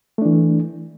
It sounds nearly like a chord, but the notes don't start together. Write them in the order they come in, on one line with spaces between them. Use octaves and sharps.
A3 D4 E3